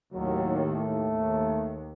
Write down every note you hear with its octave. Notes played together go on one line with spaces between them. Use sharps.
D#2 A2 F#3
A3
D#2